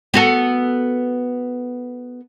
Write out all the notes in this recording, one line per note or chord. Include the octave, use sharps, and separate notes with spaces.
B3 F#4 A4